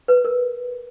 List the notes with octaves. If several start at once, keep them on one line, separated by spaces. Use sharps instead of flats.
B4
A#4